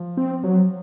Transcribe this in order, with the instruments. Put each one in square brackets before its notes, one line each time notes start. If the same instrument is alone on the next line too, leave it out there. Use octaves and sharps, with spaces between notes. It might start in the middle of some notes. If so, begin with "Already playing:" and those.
Already playing: [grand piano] F3
[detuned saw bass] C4
F#3